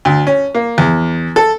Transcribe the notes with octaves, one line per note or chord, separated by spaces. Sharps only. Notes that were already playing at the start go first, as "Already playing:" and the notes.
D2
C#4
A#3
E2
A4